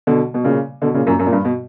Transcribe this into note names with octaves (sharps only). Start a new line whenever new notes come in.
B2 D3
B2
A#2 C#3
B2 D3
A#2 C#3
F#2 A#2
F#2
A#2
G2
B2